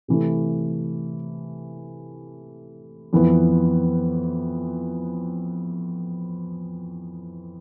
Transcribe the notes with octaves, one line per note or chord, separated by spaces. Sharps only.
C3 E3 A3
F2 E3 B3